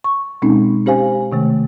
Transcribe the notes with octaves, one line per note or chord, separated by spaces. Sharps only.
C#6
B2 G#3 C4 C#4 D#4
C#4 G4 C5 F5 G#5
C3 D#3 A3